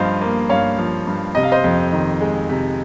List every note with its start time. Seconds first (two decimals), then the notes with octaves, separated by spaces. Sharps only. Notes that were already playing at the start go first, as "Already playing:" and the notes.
Already playing: G2 F3 C5 D#5 F5
0.21 A#3
0.49 G2 C#5 F5
0.78 F3
1.07 G2
1.35 C3 D#5
1.43 F5
1.52 C5 D#5
1.64 F2
1.92 D#3
2.21 G#3
2.49 C3